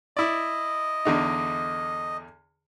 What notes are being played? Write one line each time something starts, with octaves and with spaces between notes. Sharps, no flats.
E4 D5 D#5
E2 D3 D#4